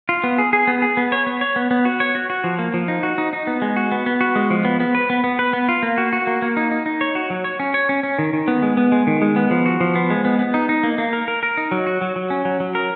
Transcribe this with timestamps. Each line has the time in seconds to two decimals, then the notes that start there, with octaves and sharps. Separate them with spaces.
0.09 F4
0.24 B3
0.38 G#4
0.53 G#4
0.68 B3
0.82 G#4
0.97 B3
1.12 C#5
1.27 B3
1.41 C#5
1.56 B3
1.71 B3
1.85 F#4
2.00 C#5
2.15 F#4
2.30 F#4
2.44 F3
2.59 A#3
2.74 F3
2.88 D#4
3.03 F#4
3.18 D#4
3.33 D#4
3.47 B3
3.62 G#3
3.76 F#4
3.92 B3
4.06 B3
4.21 F#4
4.35 G#3
4.50 F3
4.65 B3
4.80 B3
4.95 B4
5.10 B3
5.24 B3
5.39 B4
5.53 B3
5.69 F4
5.83 A#3
5.98 F#4
6.13 F#4
6.27 A#3
6.42 A#3
6.57 D#4
6.71 D#4
6.86 D#4
7.01 C#5
7.15 F#4
7.30 F#3
7.44 C#5
7.60 C#4
7.74 C#5
7.89 C#4
8.03 C#4
8.19 D#3
8.33 D#3
8.48 B3
8.62 G#3
8.77 B3
8.92 G#3
9.07 D#3
9.22 G#3
9.36 B3
9.51 F3
9.66 F#4
9.81 F3
9.95 B3
10.10 G#3
10.25 B3
10.39 B3
10.54 D#4
10.69 D#4
10.83 A#3
10.98 A#3
11.13 A#4
11.28 A#4
11.43 A#4
11.57 D#4
11.71 F#3
11.87 F#4
12.01 F#3
12.16 F#3
12.30 C#4
12.45 F#3
12.60 F#3
12.75 A#4